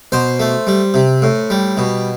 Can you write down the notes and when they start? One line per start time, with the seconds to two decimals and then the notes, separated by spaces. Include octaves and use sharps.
0.12 B2 C5
0.40 A3
0.67 G3
0.94 C3
1.22 A2
1.50 G3
1.77 B2